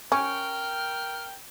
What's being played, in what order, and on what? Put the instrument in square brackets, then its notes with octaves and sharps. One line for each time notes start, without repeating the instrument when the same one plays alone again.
[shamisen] C#4 [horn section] A#4 G5 [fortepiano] C#6 [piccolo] F6